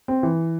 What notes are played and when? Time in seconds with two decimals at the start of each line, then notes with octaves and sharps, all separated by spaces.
0.08 C4
0.23 E3